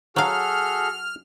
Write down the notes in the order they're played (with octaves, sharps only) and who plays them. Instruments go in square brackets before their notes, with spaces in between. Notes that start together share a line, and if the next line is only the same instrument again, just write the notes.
[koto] F#3 F5 [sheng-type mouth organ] F#4 G#4 A4 [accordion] F6